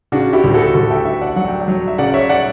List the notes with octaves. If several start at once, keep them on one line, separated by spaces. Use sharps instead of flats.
C#3 D4 F#4
E4 G4
D2
F#4 A4
D2 F#4 A4
E5 G5
D2 E5 G5
D5 F#5
F#3 F#5
G5
D5 F#5
F#3
E5
C#3 D5 F#5
C#5 E5
D5 F#5